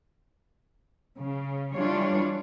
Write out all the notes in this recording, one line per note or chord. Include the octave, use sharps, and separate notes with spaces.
C#3
E3 G3 D4 F4 C#5